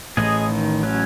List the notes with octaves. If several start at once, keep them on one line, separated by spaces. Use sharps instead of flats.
A1 A2 G#4 D#5
D#3
F#3 C#4